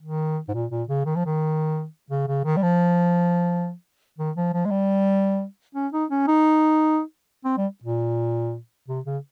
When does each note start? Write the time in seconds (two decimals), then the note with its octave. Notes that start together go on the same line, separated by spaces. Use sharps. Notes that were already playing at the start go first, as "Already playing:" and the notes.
0.02 D#3
0.48 G#2
0.54 A#2
0.71 A#2
0.88 C#3
1.05 D#3
1.16 F3
1.26 D#3
2.10 C#3
2.27 C#3
2.45 D#3
2.57 G3
2.62 F3
4.18 D#3
4.36 F3
4.53 F3
4.65 G#3
4.71 G3
5.75 C#4
5.92 D#4
6.10 C#4
6.27 D#4
7.44 C4
7.57 G3
7.84 A#2
8.88 C3
9.05 C#3